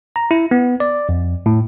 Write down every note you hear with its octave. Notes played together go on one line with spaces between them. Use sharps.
A#5
E4
B3
D5
F2
A2